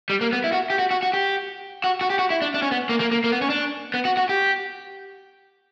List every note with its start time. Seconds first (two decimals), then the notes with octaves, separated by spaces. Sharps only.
0.10 G3
0.21 A#3
0.33 B3
0.44 E4
0.52 F#4
0.70 G4
0.79 F#4
0.91 F#4
1.03 F#4
1.13 G4
1.84 F#4
2.01 F#4
2.10 G4
2.19 F#4
2.30 E4
2.42 D4
2.54 D4
2.62 C#4
2.72 B3
2.89 A#3
3.00 A#3
3.12 A#3
3.24 A#3
3.32 B3
3.42 C#4
3.50 D4
3.94 B3
4.05 F#4
4.17 F#4
4.29 G4